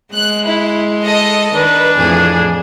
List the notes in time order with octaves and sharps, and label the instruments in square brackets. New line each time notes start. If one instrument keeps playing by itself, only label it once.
[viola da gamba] G#3 [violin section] F#6
[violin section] E4
A4 D#5
[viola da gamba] D#3 [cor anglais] D4 [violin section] B4
[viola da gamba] F2 A2 E3 [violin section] G#4